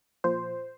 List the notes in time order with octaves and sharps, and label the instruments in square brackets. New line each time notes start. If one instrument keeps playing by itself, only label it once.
[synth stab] A#2 F3 C5